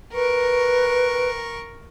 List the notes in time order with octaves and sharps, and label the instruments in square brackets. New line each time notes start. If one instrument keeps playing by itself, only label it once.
[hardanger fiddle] A#4 C#6 [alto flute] B4